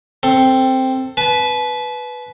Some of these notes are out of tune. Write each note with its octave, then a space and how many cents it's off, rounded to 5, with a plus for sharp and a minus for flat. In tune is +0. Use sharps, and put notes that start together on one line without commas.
C4 +0 A4 +15
B4 +0 A5 -40